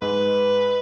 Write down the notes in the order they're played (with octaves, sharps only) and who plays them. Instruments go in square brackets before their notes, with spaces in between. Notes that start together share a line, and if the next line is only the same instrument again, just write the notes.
[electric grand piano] G#2 G#3 [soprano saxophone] B4